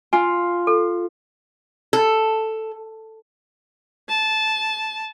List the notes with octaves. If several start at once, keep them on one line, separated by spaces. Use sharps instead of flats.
F4 G#5
A4
A4
A5